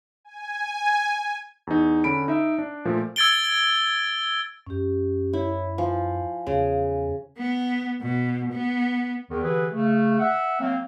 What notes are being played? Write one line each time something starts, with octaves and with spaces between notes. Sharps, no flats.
G#5
E2 D#4
D3 C#4 B5 D7
D#4 E5
D4
A#2 F3 A3
E6 G#6 A6 D7 G7
F#2 C#4 G4
E4 C#5
F3 G#5
E2 C#3
B3
B2
B3
E2 D#3
D3 E3 G4 G#4 B4
C#3 A3
E5 F#5
F#3 A#3 C4